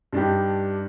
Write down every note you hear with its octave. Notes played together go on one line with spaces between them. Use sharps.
G2 D4 D#4 G4